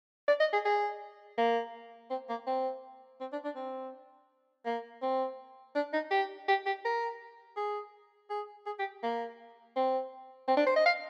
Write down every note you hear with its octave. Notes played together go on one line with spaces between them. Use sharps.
D5
D#5
G#4
G#4
A#3
C4
A#3
C4
C4
D4
D4
C4
A#3
C4
D4
D#4
G4
G4
G4
A#4
G#4
G#4
G#4
G4
A#3
C4
C4
D4
C5
D#5
F5